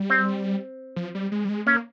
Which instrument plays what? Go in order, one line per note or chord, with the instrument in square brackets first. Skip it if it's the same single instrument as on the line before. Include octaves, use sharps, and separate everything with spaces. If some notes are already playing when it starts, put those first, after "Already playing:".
Already playing: [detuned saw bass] G3
[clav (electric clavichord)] C4
[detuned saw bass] F3
G3
G#3
G3
G#3
[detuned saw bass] A#3 [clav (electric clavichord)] C#4